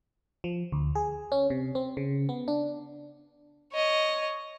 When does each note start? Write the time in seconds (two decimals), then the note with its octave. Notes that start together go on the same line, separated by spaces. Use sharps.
0.44 F3
0.72 D2
0.95 G#4
1.32 C#4
1.50 C3
1.75 C4
1.97 C#3
2.29 B3
2.48 D4
3.73 C#5 D#5